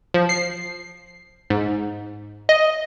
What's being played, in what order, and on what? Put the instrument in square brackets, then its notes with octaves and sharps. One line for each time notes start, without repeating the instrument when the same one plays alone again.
[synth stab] F3
C7
G#2
D#5